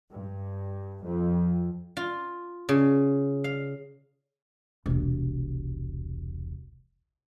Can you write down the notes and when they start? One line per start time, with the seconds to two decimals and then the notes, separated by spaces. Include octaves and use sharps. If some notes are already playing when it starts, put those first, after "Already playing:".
0.12 G2
1.04 F2
1.97 F4
2.69 C#3
3.44 F5
4.86 E1 C2